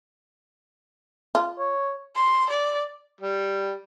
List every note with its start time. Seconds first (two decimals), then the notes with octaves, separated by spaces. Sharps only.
1.35 F4
1.59 C#5
2.15 C6
2.49 D5
3.21 G3